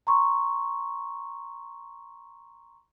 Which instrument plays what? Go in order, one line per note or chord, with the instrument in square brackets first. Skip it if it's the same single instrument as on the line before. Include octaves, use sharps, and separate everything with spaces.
[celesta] A#5 C6 C#6